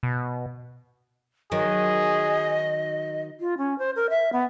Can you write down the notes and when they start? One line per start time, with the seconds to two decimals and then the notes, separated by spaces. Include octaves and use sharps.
0.03 B2
1.52 D#3 F#3 G#4 D#5
3.40 F4
3.58 C#4
3.79 C5
3.96 A#4
4.10 E5
4.32 B3